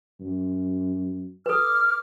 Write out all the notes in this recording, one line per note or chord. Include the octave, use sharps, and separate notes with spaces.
F#2
A4 B4 D6 F6